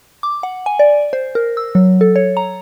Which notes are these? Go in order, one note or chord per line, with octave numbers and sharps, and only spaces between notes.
D6
F#5
G#5
D5
C5
A#4
E6
F#3
A4
C#5
A#5